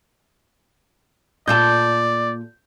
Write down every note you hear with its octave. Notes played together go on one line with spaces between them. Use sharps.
A#2 F4 A4 D5 G6